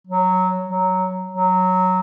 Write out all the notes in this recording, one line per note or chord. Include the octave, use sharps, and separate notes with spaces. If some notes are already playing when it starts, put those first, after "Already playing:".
F#3
F#3
F#3